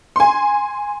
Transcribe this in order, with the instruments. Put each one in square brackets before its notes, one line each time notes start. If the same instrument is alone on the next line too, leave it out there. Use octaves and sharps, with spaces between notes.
[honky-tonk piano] G#5 C6